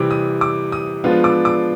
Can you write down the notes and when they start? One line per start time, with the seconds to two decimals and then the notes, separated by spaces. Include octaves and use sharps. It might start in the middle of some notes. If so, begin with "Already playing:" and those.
Already playing: C3 E3 G3 D6
0.11 D#6
0.41 D6
0.72 D#6
1.04 F3 G#3 B3 D4 F4
1.24 D6
1.45 D6